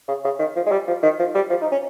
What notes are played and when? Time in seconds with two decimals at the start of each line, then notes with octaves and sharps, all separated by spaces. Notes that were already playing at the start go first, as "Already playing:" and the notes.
0.08 C#3
0.24 C#3
0.39 D#3
0.56 F3
0.66 G#3
0.71 G3
0.88 F3
1.03 D#3
1.19 F3
1.35 G3
1.50 F3
1.61 D#4
1.72 C#4